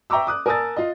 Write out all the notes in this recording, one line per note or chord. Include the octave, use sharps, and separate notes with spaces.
E5 G5 A#5 C#6 D6 E6
D6 D#6 F#6
A#4 G#5 A5 D#6 E6 A6
F4 D#5